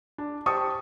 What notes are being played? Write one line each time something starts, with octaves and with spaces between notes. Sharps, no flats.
D4
G4 C5 A5 C#6 D#6